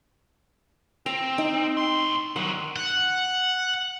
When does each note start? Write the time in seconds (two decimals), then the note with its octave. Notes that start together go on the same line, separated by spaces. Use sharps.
1.06 C4 A#5
1.38 D#4
1.77 A2 C6
2.36 D#3 F#3 F#5
2.76 F#5